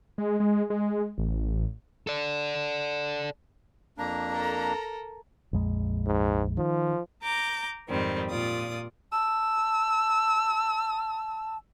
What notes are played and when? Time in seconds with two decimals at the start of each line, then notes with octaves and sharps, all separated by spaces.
0.18 G#3
0.40 G#3
0.70 G#3
1.18 A1
2.07 A4 D5
3.98 F2 A#3 D4 A#5
4.31 A4 A#4
5.53 A#1 F2 G#3
6.06 G#2
6.57 D#3 F3
7.22 A#5 D6 G6
7.88 F2 G#2 D#3 G3 C4
8.30 A#2 F4 D5 D#6
9.12 A5 E6